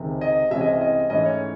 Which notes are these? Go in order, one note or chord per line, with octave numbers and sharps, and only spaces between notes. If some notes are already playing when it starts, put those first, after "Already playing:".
Already playing: C#2 C3 D#3
D#5
C2 C3 E3 G#3 C#4 E5
D#5
D#5
G#2 E3 A3 C#4 E4 D#5
C#5